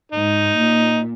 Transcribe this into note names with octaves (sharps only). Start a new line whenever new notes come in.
G#2 D#4
A#2